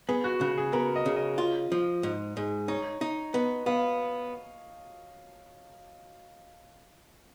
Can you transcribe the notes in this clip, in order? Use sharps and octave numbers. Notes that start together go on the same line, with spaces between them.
B3 G#4
F#4
C#3 F#4
G#4
B3 A#4
D#5
C#3
D#5
F4
F3
G#2
G#2
D#4 C#5
D#4
B3 D#5
B3 F5